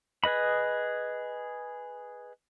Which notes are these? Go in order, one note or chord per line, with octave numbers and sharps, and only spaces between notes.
G#4 B4 D#5 B5